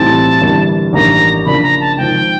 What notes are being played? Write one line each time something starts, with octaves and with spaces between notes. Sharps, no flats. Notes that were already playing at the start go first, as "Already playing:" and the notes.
Already playing: B1 A2 E3 G3 C4 A5
G1 G2 E3 G3 A#3
A1 G2 D#3 G3 A#3 A#5
C#3 F3 A#3 D4 B5
A#5
A5
G#1 G#2 F3 G5